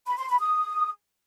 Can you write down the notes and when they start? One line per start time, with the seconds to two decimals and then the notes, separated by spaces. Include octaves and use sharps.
0.07 B5
0.18 C6
0.29 B5
0.40 D#6